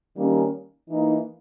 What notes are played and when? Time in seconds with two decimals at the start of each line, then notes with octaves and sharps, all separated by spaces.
0.16 D#3 G3 A#3 C#4
0.90 E3 A#3 D#4